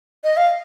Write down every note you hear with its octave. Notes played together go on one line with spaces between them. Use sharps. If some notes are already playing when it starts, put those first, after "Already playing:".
D#5
F5